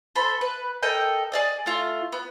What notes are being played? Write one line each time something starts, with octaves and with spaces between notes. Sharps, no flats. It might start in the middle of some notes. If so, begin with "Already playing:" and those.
A4 C5 B5
B4
A4 A#4 D#5 G5
G#4 D5 D#5
A3 F4
B3